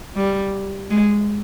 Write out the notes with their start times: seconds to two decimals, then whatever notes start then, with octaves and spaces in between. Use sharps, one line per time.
0.16 G3
0.90 G#3